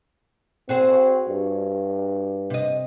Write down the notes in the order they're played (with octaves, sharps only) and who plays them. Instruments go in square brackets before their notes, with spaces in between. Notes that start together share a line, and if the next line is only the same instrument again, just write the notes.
[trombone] C4 [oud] F#4 G#4 C5
[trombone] G2
[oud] C3 D#5